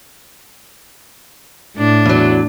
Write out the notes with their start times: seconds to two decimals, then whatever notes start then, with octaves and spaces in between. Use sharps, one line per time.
1.76 A2 D4
2.05 E2 F#3